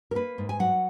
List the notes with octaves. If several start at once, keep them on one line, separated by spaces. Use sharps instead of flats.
A#4
A#3 B4
G#2
G#5
F#3 F#5